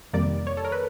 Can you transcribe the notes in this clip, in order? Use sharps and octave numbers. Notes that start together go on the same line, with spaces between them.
F2 C3 D#3 G3 A#3 D5
C#5
A4
A#4
B4